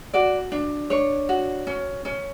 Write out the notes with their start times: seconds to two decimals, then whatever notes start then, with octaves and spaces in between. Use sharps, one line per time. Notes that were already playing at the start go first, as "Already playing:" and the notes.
0.14 F#4 D5
0.52 D4
0.90 D4 C#5
1.29 F#4
1.67 C#4
2.05 C#4